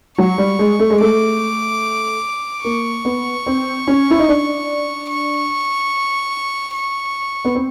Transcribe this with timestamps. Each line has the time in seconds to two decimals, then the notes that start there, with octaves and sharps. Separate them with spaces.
0.18 F#3 C#6
0.38 G3
0.59 G#3
0.79 A3
0.90 G#3
1.00 A3 D6
2.64 A#3 C#6
3.05 B3
3.46 C4
3.87 C#4
4.10 E4
4.19 D#4
4.28 D4
5.09 C#6
6.74 C#6
7.45 B3
7.55 C4